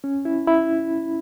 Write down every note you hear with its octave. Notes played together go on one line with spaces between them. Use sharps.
C#4
E4
E4